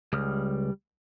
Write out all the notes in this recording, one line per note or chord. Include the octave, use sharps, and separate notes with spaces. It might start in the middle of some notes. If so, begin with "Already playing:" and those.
C#2 G3 D#6 F6